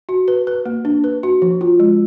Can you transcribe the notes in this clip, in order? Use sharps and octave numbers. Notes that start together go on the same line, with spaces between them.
F#4
B4
B4
A#3
D4
B4
F#4
F3
F4
G#3